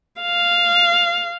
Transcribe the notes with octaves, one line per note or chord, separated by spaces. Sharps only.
F5